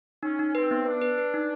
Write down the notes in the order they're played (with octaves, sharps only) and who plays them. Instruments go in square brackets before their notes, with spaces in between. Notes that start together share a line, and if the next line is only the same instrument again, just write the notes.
[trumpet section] C#4 [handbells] D#4
[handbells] D#4
[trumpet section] C4 [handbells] B4
[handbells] B3
[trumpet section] D4 [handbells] B4
[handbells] B4
B4
D#4